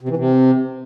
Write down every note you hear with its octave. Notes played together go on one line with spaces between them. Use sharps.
C3
E3
C3